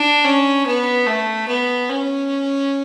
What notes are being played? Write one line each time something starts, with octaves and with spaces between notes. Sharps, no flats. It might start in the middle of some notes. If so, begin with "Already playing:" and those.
Already playing: D4
C#4
B3
A3
B3
C#4